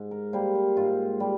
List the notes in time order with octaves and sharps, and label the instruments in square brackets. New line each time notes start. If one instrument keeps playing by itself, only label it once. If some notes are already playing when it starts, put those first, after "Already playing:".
Already playing: [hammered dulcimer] G#2
A#4
G3 A#3 C5
C5
G#2 F4
G3